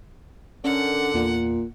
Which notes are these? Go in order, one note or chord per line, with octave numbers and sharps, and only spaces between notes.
D3 C#4 A#4 F#5
E2 A#2